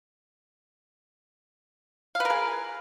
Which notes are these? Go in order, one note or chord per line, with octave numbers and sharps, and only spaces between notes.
G#4 A#4 B4 F5